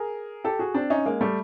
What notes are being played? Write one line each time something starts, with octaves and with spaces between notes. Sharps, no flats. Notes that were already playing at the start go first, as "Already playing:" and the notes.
Already playing: G#4 A#4
G4 A4
F#4 G#4
C4 D4
C#4 D#4
G#3 A#3
G3 A3